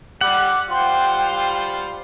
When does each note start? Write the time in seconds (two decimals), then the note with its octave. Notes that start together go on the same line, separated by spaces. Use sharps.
0.21 G3 F#5 D6
0.70 G3 F4 C5 G5 C6